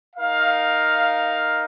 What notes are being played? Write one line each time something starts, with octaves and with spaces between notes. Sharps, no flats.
D#4 A#4 F5